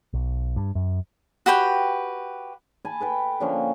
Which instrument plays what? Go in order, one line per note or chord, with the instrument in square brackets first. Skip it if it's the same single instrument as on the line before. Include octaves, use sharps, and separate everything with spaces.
[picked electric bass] B1
G2
F#2
[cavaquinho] F#4 G4 B4 G5
[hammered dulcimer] G#5 A5 B5
A4 B4 G5
D3 F3 A#3 C#4